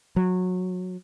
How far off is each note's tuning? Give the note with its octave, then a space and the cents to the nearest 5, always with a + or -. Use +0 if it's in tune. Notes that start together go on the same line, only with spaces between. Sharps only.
F#3 -20